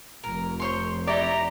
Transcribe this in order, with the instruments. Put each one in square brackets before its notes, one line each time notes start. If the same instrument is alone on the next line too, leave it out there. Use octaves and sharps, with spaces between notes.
[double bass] F1 F2 [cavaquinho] A#4
[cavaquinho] C5 C#5 C6
[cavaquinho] D#4 E4 G4 [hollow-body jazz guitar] D5 [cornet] A#5